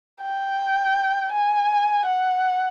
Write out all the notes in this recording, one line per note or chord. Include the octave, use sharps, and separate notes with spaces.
G5
G#5
F#5